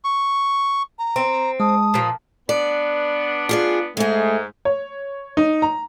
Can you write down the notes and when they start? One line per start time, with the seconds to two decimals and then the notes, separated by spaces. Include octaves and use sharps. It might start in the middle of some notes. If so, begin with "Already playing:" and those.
0.04 C#6
0.99 A#5
1.16 C4
1.60 G#3 A5 D#6
1.94 A#2 F3
2.49 B3 D4 D5
3.49 F4 G#4 D5
3.97 G#2 G#3 A3 G#4
4.65 C#5
5.37 D#4
5.62 A#5